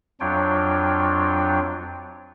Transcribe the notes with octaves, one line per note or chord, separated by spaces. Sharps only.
F2 F#3 D4 F4 C#5 G5